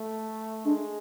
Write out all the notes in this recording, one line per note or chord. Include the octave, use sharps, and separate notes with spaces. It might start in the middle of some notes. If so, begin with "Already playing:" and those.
Already playing: A3
G#3 D4